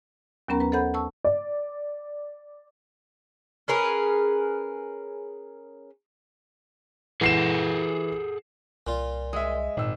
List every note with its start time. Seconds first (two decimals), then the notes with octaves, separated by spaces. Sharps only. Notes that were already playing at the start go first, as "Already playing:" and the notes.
0.48 D#2 F#3 B3 C#4 A#4 A#5
0.60 B4 A#5
0.72 A4 C5 D#5 F#5 B5 G6
0.94 A5 C#6 E6
1.24 D5
3.68 C#4 G#4 A#4 B4
7.21 E3 G#4 A4 F#5 C7 E7
8.87 C2 A#2 F4
9.33 G#3 E5 D#6
9.77 G#1 A#2 E6